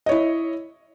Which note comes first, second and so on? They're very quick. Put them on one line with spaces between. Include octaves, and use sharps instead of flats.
D#5 C#5 E4